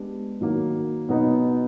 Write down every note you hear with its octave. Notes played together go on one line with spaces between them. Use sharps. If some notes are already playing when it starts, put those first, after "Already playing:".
Already playing: G#3 B3 D4 G4
D#3 F#3 A#3
B2 F#3 B3 D#4